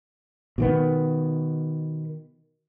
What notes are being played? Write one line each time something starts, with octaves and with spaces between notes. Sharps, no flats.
B2 D#3 B3